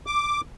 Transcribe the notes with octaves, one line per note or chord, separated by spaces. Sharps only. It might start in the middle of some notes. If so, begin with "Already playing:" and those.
D6